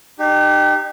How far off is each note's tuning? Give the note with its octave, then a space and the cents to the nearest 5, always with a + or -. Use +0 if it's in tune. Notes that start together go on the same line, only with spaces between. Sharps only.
D#4 -40 G4 +0